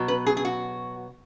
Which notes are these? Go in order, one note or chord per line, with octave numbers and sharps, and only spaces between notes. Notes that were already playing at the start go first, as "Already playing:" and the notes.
Already playing: B2 F#3
B4
G#4
G#4
F#4